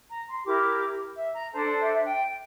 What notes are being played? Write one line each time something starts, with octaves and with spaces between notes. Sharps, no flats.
A#5
C6
E4 G4 A#4 D6
E5
A#5
D4 A4 C5 A5
D5
E5
E5
G5